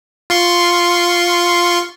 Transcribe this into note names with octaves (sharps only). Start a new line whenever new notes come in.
F4 C6 C#6